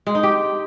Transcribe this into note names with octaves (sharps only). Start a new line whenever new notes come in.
G#3
D#4
G4